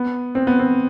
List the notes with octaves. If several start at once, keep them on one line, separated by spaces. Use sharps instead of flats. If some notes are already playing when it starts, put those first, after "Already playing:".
Already playing: B3
C4
B3
C4